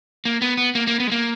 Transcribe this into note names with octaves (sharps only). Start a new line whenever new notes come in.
A#3
B3
B3
A#3
A#3
B3
G#3
A#3